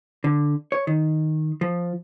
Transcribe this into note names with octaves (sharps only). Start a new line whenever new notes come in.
D3
C#5
D#3
F3